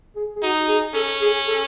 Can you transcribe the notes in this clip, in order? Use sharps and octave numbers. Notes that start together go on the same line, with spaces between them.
G#4
G#4
D#4 F#4
G#4
C#4 A4
G#4
A4